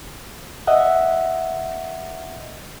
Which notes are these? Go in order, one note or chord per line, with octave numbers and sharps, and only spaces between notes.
D#5 E5 F#5